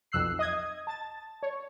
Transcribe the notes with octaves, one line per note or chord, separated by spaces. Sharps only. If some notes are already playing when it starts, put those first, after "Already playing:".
B1 F2 E6 F#6 C7
D#5 D#6 G#6
A5 A6
C#5